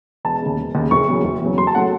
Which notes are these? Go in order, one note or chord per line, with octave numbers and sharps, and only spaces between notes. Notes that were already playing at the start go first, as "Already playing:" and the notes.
E1 A5
D#2 C#3
E1
D#2 C#3
F#1 C#6
E2 C#3 F#3
F#1
E2 C#3 F#3
F#1 C6
A5
C#3 F#3 A3 F#5